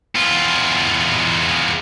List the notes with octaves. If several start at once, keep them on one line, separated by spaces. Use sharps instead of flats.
E2 F4